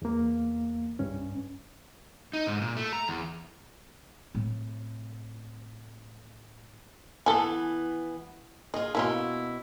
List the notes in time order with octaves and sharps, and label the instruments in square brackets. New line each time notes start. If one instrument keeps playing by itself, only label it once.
[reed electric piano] E2 A#3
C2 G2 C#4
[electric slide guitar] D#4
G#2
A#2
A3
A#5
E2
[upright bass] A2 C3
[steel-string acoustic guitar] E3 B3 [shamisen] A4 G#5
[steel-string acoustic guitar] F4 G#4 [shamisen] D#5
[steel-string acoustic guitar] B2 E4 [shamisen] A#3 C#4 F4